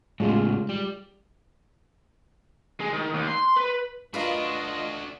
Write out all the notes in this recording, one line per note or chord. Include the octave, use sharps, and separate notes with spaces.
A2 C#3 G#3 F4
G3
G#3
D#3
D#2
C6
B4
D4 F4 F#4 B4 D#5 F5 A#5